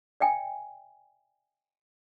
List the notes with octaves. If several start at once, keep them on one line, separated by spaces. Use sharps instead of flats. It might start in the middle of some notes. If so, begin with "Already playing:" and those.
D5 E5 G5 G#5